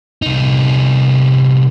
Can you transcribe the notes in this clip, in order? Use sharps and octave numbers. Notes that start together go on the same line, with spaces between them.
C2 D#4